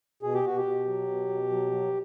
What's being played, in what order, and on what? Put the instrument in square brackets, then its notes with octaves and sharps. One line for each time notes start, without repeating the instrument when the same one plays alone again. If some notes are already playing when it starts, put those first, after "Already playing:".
[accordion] B2 G#4
G4
B2 F#4
G4
B2
F#3
B2
B2
F#3
F#3